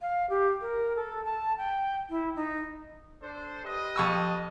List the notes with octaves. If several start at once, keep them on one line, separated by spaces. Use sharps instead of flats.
F5
G4
A#4
A4
A5
G5
E4
D#4
D4 A4 C5
G4 B4 D#5
F2 C#6 E6